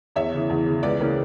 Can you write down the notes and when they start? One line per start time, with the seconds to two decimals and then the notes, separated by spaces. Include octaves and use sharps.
0.16 E2 C#5 E5
0.33 C#3 E3
0.49 E2
0.66 C#3 E3
0.83 C#2 B4 D5
0.99 C#3 E3 A#3 C#4